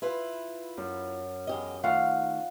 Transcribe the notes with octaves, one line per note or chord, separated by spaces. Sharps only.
E4 F4 B4
F#2
E2 G4 D#5
D#3 A3 F4 F5 F#5